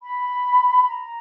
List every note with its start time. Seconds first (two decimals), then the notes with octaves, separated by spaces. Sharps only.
0.02 B5
0.87 A#5